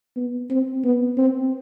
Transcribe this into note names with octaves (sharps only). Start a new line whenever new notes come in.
B3
C4
B3
C4